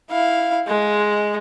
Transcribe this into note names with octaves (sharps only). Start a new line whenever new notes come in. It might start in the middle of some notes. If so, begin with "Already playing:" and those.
E4 F5
G#3